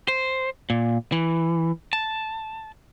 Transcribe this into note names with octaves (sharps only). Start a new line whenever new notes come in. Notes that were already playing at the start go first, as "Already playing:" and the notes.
C5
A#2
E3
A5